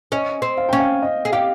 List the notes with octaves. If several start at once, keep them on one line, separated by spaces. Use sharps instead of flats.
C#4 D#5
C4
F5
C#4 G5
F5
D#5
G#4
G4 F5